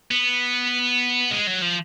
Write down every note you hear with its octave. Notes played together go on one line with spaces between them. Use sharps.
B3
G#3
F#3
F3